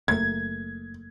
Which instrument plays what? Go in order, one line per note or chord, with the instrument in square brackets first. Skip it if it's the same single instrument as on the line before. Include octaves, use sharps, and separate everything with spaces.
[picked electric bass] F#1 A3 A#3 [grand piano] G#6